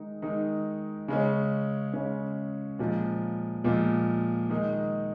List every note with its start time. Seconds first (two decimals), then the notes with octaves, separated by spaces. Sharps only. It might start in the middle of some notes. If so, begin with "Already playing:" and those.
Already playing: D#3 G#3 D#4
0.22 D#3 G#3 D#4
1.08 C#3 G#3 C#4
1.93 C#3 G#3 C#4
2.79 A#2 F3 G#3
3.64 A#2 F3 G#3
4.50 D#3 G#3 D#4